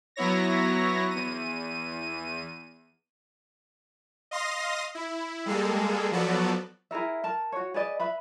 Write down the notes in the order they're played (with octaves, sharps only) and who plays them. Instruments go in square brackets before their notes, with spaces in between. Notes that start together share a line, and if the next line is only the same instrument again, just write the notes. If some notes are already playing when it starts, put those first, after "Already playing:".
[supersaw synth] F#3 B3 E4 C#5 A#6
E2 D#7
D#5 F5 C6 D#6 A#6
E4
G3 G#3 A#3 G#4 A4
F3 F#3 B3 F#4 A4 D5
[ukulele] E4 G#4 A#4 E5
A#4 A5
F#4 C#5
G#4 B4 D5 D#5
B4 E5 B5